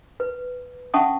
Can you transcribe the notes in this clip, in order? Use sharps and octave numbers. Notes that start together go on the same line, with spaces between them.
B4
C#4 E5 F#5 A5 C#6 D#6